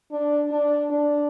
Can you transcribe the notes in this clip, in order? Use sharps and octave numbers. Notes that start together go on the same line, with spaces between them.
D4
D4
D4